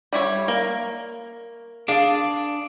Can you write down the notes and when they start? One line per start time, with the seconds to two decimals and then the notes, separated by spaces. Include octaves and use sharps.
0.13 G3 E4 C#5
0.48 A#3
1.88 D4 G#4 D5 F5